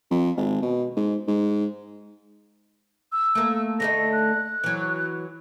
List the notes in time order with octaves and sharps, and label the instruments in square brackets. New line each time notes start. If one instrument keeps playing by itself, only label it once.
[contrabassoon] F2
G#1
B2
G#2
G#2
[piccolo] E6
[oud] A3 A#3
[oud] D3 A3 D#4 [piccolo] A#6
[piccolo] F#6
[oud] E3 F#3